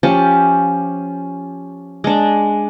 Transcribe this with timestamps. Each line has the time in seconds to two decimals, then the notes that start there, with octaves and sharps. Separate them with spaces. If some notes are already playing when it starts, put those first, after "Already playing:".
0.03 F3 C#4 G4
2.04 G#3 D4